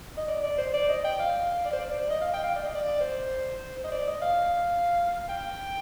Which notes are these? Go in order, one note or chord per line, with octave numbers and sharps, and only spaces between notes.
D#5
D5
D5
C5
D5
D#5
G5
F5
D5
C5
D5
D#5
F5
G5
F5
D5
D#5
D5
C5
D#5
D5
D#5
F5
G5